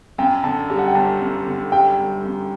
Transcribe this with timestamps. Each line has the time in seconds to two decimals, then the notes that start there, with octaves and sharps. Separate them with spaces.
0.18 F#2 G5
0.43 D3 A5
0.70 G3 A5
0.79 F#5
0.87 G5
0.95 G1 A5
1.21 F#2
1.46 D3
1.72 G3 G5
1.97 G1
2.23 F#2